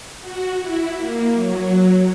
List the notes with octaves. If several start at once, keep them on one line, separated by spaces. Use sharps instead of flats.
F#4
E4
A#3
F#3